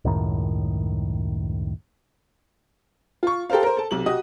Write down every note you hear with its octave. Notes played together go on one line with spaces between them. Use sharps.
C#2 F#2 A2 D#3
F4 C#6
G4 A4 A#4 C5 F5
A#4 C5
A4 A5
B1 C3 F#7
F#4 G4 D#5 D#6